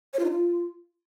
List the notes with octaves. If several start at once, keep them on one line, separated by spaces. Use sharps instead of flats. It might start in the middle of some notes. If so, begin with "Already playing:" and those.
C#5
F4
D#4
F4